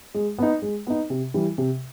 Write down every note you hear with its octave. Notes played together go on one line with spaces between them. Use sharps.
G#3
B3 D#4
G#3
B3 D#4
C3
E3 G3
C3